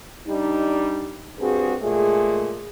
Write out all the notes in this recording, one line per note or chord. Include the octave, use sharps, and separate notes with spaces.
G3 D4 D#4
G2 C4 F#4 G#4
A#2 G#3 A3 G#4